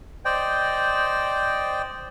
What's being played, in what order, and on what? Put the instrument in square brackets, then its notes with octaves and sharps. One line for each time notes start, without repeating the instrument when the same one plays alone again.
[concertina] C5 D5 D#5 G5